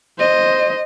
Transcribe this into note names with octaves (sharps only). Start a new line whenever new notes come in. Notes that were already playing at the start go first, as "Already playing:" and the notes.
C5 D#5